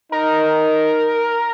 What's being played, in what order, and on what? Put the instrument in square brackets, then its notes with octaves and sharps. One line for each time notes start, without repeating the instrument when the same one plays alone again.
[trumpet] D#4 [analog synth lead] A#4